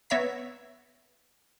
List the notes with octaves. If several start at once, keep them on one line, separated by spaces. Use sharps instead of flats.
B3 C#5 E5 A#5 B6